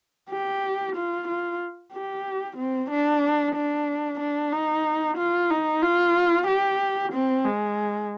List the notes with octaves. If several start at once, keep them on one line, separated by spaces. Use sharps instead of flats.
G4
F4
F4
G4
C4
D4
D4
D4
D#4
F4
D#4
F4
G4
C4
G#3